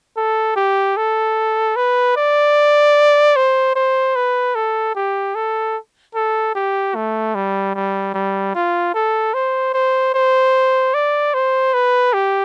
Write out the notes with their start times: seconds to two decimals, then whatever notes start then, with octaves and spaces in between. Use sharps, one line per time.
0.17 A4
0.56 G4
0.97 A4
1.77 B4
2.17 D5
3.36 C5
3.76 C5
4.16 B4
4.55 A4
4.96 G4
5.35 A4
6.15 A4
6.55 G4
6.95 A3
7.35 G3
7.75 G3
8.14 G3
8.55 F4
8.94 A4
9.34 C5
9.74 C5
10.14 C5
10.94 D5
11.34 C5
11.74 B4
12.13 G4